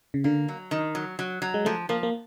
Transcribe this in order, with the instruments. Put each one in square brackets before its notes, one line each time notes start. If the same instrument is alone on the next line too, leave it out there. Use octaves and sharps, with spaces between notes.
[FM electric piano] C#3
[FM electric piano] D3 [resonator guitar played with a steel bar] A#3
[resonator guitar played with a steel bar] F#3
D#3
F#3
F#3
F#3
[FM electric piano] G#3
[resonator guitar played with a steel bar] F3 [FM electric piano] A3
[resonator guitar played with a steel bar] F3 [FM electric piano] A#3
[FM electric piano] A#3